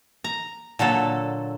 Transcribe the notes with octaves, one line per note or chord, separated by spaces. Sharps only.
A#5
A#2 D3 F#3 A4